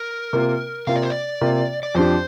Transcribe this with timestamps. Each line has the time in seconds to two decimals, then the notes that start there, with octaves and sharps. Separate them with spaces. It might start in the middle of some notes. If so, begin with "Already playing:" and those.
Already playing: A#4
0.33 C3 A#3 F4
0.87 C3 A#3 F4 F5
0.96 D5
1.02 C5
1.10 D5
1.41 C3 A#3 F4
1.83 D5
1.95 F2 F3 D4 G4 C5